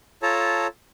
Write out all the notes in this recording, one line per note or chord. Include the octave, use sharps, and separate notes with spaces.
F4 A4 C#5 A5 A#5